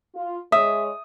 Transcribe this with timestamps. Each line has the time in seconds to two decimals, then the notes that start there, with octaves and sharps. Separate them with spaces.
0.14 F4
0.52 G#3 C#5 E5 D#6